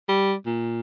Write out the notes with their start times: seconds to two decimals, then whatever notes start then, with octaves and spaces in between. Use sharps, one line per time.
0.08 G3
0.46 A#2